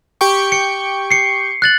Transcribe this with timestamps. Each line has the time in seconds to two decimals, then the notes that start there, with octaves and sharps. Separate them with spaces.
0.21 G4 G5 C#6
0.52 C#7
1.11 C7 C#7
1.62 F#6 A6 F#7